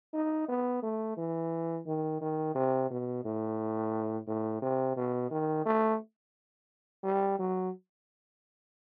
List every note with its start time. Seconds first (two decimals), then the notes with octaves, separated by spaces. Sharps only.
0.14 D#4
0.49 B3
0.83 A3
1.17 E3
1.86 D#3
2.21 D#3
2.55 C3
2.90 B2
3.25 A2
4.27 A2
4.62 C3
4.97 B2
5.31 D#3
5.66 A3
7.04 G3
7.39 F#3